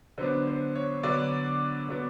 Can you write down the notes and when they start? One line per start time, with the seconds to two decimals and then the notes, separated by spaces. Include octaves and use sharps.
0.18 D3 F#3 B3 D4 C5
0.47 C5
0.76 C#5
1.03 D3 F#3 B3 D4 D5
1.88 D3 F#3 B3 D4